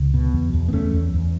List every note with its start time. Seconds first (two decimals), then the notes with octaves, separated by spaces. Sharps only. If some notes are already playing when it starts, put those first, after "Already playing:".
Already playing: C#2
0.14 B2
0.33 E2
0.53 E2
0.68 B3
0.73 E2 A3 C#4
0.93 E2
1.14 E2